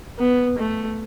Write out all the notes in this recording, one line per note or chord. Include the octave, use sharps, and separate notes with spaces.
B3
A3